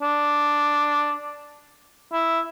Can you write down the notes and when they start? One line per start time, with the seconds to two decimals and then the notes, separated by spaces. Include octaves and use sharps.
0.02 D4
2.12 E4